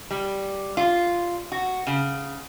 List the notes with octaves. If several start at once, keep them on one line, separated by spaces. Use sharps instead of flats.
G3
F4
F#4
C#3